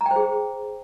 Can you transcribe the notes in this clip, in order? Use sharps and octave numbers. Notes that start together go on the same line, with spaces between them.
A#5
G5
C5
G#4